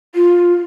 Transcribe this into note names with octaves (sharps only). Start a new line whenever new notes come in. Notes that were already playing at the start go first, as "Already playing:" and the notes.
F4